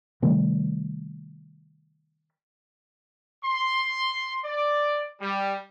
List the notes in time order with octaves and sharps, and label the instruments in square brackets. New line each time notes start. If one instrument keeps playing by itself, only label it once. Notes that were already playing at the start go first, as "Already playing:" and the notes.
[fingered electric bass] C3 D#3 G3 A3
[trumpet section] C6
D5
G3